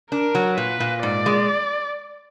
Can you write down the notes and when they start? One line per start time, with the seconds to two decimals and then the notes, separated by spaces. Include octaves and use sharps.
0.11 D4 A#4
0.35 F#3
0.57 A#2 B4
0.80 A#2
1.02 G#2 D5
1.26 G#3